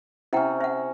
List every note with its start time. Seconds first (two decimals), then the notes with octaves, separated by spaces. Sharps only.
0.33 C3 C#4 E4 F#5 G5
0.60 E5 F#5